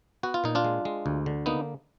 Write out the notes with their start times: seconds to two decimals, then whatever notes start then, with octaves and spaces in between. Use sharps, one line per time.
0.23 B3 F#4
0.34 F4
0.44 A#2 D#4
0.55 D4 F4
0.65 G#3
0.85 G#3
1.06 D2
1.26 D3
1.46 A#3 B3 D#4